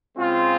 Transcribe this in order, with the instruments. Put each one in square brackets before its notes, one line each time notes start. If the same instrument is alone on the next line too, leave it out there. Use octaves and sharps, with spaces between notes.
[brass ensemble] C#3 G#3 C4 F4